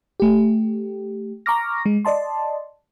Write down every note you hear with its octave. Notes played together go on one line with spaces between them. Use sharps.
A3 G4
A#5 C#6 D6 F6 A#6
G#3
D5 D#5 A5 C6